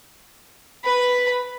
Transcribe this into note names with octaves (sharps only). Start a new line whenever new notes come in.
B4 B5